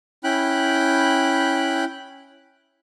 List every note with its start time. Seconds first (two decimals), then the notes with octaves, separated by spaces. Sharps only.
0.24 C#4 E4 G5 B5 F#6